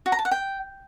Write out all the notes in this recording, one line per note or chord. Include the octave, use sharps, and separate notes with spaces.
F#4
A#5
A5
F#5
G5